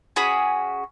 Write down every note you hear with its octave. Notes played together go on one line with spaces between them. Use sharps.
C#4 F#4 G#4 B5